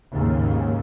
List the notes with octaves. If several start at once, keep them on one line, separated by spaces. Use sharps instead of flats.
D#2 G#2 C#3